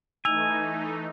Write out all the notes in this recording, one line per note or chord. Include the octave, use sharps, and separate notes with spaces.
E3 A3 D#4 G#5 E6 F7